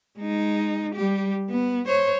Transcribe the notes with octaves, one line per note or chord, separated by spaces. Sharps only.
G#3 D#4
G3 G4
B3
C5 C#5